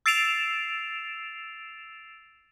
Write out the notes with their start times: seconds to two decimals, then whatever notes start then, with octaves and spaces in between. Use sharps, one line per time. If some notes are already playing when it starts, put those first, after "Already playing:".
0.06 E6 A6 C7 D7 E7 F7